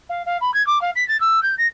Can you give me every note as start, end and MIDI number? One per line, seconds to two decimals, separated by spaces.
0.09 0.25 77
0.26 0.38 77
0.41 0.54 83
0.54 0.65 92
0.67 0.81 86
0.82 0.91 77
0.96 1.06 95
1.08 1.19 93
1.21 1.42 88
1.43 1.55 91
1.58 1.67 94